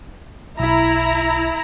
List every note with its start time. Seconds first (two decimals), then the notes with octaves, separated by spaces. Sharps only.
0.59 B1 E4 A#5